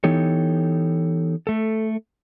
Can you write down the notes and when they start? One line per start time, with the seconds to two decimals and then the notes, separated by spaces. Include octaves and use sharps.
0.04 E3 B3 D#4 G4 A4 C#5
1.47 A3 A4